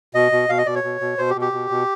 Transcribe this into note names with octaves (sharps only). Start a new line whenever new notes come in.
B2 D#5
B2
B2 F5
D#5
B2 D5
C#5
B2
B2
B2 C5
G4
B2
G4
B2
B2